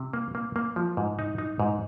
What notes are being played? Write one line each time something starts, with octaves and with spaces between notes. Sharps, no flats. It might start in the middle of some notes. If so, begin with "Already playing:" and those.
Already playing: C3
A#3
A#3
A#3
F3
G#2
D#4
D#4
G#2